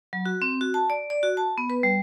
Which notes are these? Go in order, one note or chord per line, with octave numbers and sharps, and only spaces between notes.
F#3
F#4
C4
F#4
A5
D5
D5
F#4
A5
B3
B4
G3